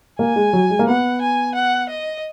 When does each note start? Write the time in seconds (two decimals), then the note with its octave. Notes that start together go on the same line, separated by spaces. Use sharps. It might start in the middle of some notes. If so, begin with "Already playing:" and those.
0.19 A#3 G#5
0.36 G#3
0.53 F#3
0.70 G#3
0.79 A#3
0.87 B3 F#5
1.21 G#5
1.55 F#5
1.90 D#5